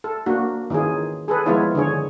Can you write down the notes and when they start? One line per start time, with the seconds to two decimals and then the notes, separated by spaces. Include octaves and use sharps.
0.04 A4
0.26 A#3 D4 F#4
0.70 D#3 E3 C#4 F4 G#4
1.28 G#4 A4 B4
1.46 F3 G#3 B3 E4 F4 C#5
1.75 D3 D#3 G#4 C#5